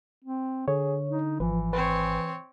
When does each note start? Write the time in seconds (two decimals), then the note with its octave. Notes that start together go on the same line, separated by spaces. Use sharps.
0.24 C4
0.68 D3 G#4 C#5
1.10 D#4
1.40 G#1 E3 F3 B4
1.73 C4 B4 C#5